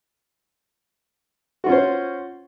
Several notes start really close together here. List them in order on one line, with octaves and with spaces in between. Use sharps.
F#4 F4 C#4 C5